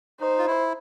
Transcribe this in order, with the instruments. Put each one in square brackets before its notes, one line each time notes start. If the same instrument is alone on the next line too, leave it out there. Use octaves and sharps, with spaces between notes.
[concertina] D#4 [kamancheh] C5
[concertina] F4
E4